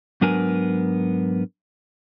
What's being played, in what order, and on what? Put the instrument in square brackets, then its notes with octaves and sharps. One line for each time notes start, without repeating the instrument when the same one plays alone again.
[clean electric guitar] G#2 F#3 B3 D4 A#4 G#5